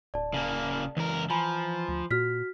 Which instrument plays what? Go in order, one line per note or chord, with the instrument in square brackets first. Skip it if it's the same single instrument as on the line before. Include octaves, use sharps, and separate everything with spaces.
[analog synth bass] D1 [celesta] D5 A5
[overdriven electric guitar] C#3 A#3
[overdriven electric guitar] C#2 A#4 [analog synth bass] E3
[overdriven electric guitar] F3 [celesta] G#5 A#5 B5
[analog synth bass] D2
[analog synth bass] A#2 [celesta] F#4 F6 B6